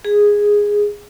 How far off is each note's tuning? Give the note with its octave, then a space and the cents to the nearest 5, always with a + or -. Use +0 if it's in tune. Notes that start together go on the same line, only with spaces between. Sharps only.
G#4 -10